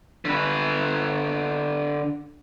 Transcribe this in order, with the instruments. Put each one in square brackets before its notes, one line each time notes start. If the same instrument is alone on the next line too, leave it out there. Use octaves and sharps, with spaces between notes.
[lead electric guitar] D3 B4